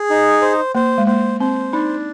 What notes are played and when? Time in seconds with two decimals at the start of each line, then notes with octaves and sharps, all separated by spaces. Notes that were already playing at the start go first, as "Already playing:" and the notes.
Already playing: G#4
0.10 D#4
0.42 C5
0.75 A#3 C5
0.98 G#3
1.07 A#3 C5
1.40 C4 C5
1.73 D4 D#4